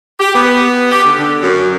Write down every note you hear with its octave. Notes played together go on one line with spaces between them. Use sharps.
G4
B3
G4
D3
D3
F#2